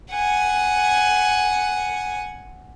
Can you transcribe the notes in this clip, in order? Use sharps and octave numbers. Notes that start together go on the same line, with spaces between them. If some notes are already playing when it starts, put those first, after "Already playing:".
F#5 G#5